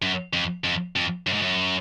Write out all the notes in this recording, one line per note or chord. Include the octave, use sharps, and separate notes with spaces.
F#2
F2
F2
F2
F#2
G#2
F#2